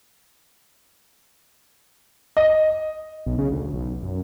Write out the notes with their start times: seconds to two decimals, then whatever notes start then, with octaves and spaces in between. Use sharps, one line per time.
2.37 D#5
3.26 B1
3.38 C#3
3.52 D2
3.74 B1
4.03 F#2